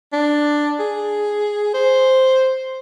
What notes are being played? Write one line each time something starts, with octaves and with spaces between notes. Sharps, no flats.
D4
G#4
C5